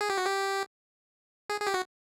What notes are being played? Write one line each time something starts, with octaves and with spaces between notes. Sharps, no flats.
G#4
G4
F#4
G4
G#4
G#4
G4
F#4